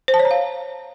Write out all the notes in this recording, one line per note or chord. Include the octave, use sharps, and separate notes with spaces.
C5
A5
C#5
A#5
F5